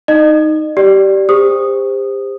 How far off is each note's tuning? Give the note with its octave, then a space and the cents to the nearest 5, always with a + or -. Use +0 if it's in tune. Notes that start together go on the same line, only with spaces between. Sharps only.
D#4 +0 D#5 -35
G4 -15 D5 +0
G4 +35 C5 +0 D#6 -10